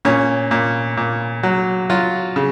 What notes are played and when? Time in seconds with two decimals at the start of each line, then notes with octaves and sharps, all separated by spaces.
0.05 A#2 C#4
0.51 A#2
0.97 A#2
1.43 F#3
1.90 F#3 F4
2.36 C#3